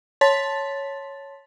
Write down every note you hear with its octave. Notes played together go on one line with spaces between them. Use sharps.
C#5 A5 C6 A6 B6